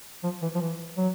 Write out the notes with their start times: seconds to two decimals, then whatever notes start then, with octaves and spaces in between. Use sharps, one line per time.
0.23 F3
0.42 E3
0.55 F3
0.61 E3
0.97 F#3